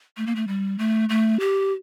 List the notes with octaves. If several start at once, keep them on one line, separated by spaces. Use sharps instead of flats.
A3
A#3
A3
G3
A3
A3
G4